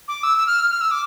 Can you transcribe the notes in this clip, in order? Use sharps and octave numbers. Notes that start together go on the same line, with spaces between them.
D6
E6
E6
F6
F6
E6
D6